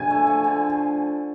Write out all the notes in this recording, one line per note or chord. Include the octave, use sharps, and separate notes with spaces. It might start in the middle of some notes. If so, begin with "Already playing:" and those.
Already playing: D3 F3 G#5
A3
F3
D3